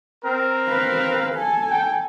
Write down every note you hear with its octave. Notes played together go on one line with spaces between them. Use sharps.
C4 A#4
B4 F5
A4 G#5
G5